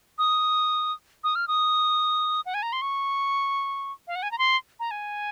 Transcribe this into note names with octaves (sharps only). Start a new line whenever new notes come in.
D#6
D#6
F6
D#6
F#5
G#5
A#5
C6
C#6
F5
F#5
G#5
A#5
C6
A#5
G#5